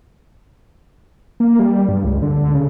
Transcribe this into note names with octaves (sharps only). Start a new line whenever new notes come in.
A#3
G3
G2
C#2
D3
C#3